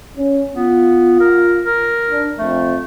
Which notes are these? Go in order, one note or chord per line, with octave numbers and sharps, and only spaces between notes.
C#4
B3 F4
A#4
A#4
D4
F2 A3